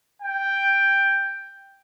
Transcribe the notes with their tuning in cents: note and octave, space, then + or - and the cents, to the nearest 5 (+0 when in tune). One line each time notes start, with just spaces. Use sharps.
G5 +5